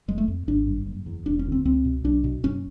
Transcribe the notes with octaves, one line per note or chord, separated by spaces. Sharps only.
F1 G#3
A3
F2
G#1 D4
G2
F#1
E2
E1 D4
C#4
D2
C4
C#2 C4
B2
B1 D4
B2
F#1 C#4